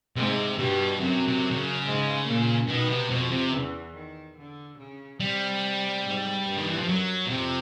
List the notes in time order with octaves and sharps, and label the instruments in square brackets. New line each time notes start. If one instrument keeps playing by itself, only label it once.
[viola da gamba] G#2 G#3 [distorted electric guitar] C3
[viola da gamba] G2 G3 [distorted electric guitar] B2
[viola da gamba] F#2 F#3 [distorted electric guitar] C3
[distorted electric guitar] C3
C3
C#3
[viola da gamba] G#2 G#3
A#2 A#3
[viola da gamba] B2 B3 [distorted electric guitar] D#3
[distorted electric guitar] C3
[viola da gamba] F2 F3 [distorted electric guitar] B2
[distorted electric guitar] C3
[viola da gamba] E2 E3
D#3
D3
C#3
[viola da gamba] C3 [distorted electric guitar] G3
[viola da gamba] G#2
G2
[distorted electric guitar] D#3
E3
F3
[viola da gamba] F#2 [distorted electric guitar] F#3
[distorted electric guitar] B2
[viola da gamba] F2 [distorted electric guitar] C3